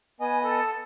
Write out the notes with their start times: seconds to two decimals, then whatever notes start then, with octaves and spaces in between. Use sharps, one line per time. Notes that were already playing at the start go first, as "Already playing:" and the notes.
0.20 B3 D#5 G#5
0.44 A4